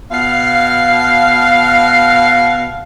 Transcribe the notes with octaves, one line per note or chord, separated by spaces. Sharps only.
B2 F5